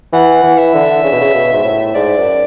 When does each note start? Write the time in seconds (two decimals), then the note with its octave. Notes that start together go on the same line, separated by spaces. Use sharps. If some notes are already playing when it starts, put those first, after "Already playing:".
0.13 E3 F#5
0.43 E3
0.58 E5
0.74 D3
1.04 C#3
1.12 B2
1.21 C#3
1.34 B2
1.53 G#2
1.64 A2
1.94 G#2 D5
2.18 F#2